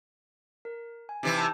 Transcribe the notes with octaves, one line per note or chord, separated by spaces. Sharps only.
A#4
G#5
C3 E3 D#4 E4 G4
A5 G6